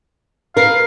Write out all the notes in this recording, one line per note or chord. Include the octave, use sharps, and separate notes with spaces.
A#4 B4 F5